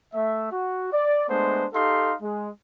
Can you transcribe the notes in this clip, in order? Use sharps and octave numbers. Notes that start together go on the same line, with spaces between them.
A3 E5
F#4
D5
G#3 A3 B3 D4 C5
D#4 G4 A4 F5 C6
G#3